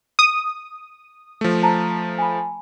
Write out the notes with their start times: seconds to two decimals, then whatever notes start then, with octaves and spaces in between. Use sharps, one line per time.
0.19 D#6
1.41 F3 A3
1.62 C5 A5 A#5
2.19 G#5 B5